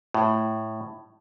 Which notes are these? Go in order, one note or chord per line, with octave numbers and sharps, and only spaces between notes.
A2